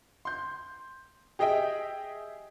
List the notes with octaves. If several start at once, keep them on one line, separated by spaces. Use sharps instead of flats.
C6 G6
G4 G#4 D#5 E5 G5